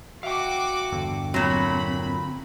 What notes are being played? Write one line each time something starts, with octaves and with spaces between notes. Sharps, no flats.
F#4 E5 F5 G5 D6
E2 G2 D3
A#2 F#3 C4 B5